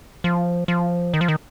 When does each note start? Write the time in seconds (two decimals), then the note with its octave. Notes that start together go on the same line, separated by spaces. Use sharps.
0.24 F3
0.68 F3
1.14 D#3
1.21 F3
1.28 D#3